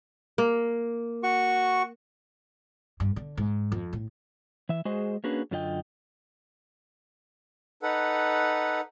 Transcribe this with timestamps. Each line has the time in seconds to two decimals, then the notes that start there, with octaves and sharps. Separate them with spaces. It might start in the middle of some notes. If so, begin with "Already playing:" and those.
0.38 A#3
1.23 F#4 C#6
3.00 G2
3.16 D3
3.37 G#2
3.72 F2
3.93 A2
4.69 E3 E5
4.85 G#3 F#4 G#4 C5 D#5
5.24 A#3 C#4 D4 F#4 G#4 B4
5.51 F#2 D3 F4 D#5 G5
7.83 D#4 A4 B4 F#5